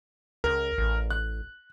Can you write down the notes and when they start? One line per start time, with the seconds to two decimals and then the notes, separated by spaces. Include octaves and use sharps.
0.44 C#2 A#4
0.78 A1
1.11 F#6